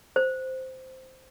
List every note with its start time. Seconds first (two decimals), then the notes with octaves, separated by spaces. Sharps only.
0.16 C5